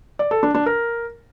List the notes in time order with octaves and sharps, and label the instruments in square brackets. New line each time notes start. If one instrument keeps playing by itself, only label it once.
[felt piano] D5
A4
D4
D4
A#4